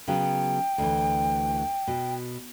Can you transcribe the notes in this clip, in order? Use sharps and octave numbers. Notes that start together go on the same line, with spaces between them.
C#3 F#3 B3 G5
D2 E3
B2